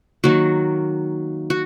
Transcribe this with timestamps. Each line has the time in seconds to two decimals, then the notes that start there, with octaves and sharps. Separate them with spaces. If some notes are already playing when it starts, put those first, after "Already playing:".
0.24 D#3 F#3 A#3 F#4
1.50 F#4